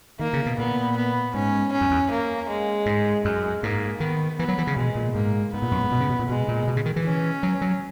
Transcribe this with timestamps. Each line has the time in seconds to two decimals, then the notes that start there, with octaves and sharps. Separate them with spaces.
0.19 D#3 A#3
0.33 C#3
0.46 B2
0.58 A#2 B3
0.96 B3
1.34 G#2 C#4
1.72 C#4
1.81 F#2
1.91 E2
2.11 A#3
2.48 G#3
2.86 G#2
3.24 F#2 G#3
3.62 G#2 A#3
4.00 D#3 B3
4.39 E3 B3
4.48 F#3
4.58 E3
4.67 C#3
4.77 B2 G#3
4.95 A#2
5.15 G#2 A#3
5.53 G#2 B3
5.62 A#2
5.71 F#2
5.81 G#2
5.92 B2
6.00 C#3
6.09 B2
6.19 A#2
6.29 B2 G#3
6.48 A#2
6.68 B2
6.77 C#3
6.86 D#3
6.96 E3
7.05 C#4
7.43 F#3
7.61 F#3